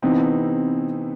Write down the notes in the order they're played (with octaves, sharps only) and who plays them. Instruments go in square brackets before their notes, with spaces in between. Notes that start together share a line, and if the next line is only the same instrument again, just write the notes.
[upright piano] C3 E3 B3 D#4 [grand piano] C4